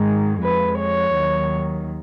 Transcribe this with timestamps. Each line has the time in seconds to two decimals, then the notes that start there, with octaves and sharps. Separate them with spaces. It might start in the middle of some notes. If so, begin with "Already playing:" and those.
Already playing: G#2 D#3 G#3
0.41 F2 F3 G#3 B4
0.78 C#5
1.14 D#2 D#3 F#3